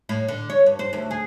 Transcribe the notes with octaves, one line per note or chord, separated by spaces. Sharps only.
A2
D3
C#5
G2
C5
D2
G#4